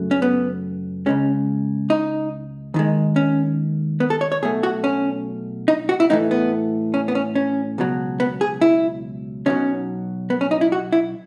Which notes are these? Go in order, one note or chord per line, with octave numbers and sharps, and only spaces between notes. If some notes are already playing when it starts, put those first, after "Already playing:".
Already playing: F#2 C#3 F#3 A3
C#4
B3
C#2 C#3 G#3 C#4
D#4
D#2 D#3 G#3
C#4
B3
A4
C#5
C#5
B1 B2 A3 G#4
F#4
C#4
D#4
F#4
E4
A2 E3 A3 D#4
B3
C#4
B3
C#4
C#4
C#2 B2 F#3
B3
G#4
E4
B1 B2 F#3 C#4
B3
C#4
D#4
E4
F#4
E4